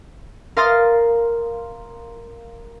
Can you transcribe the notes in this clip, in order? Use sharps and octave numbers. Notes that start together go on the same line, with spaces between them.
A#4 F5 C6 D#6 F6 A6